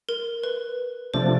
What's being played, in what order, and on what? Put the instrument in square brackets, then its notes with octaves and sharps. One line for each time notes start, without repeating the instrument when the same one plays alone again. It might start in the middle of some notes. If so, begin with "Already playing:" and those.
[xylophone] A#4
B4
[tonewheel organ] C3 F3 A3 D4 [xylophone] C5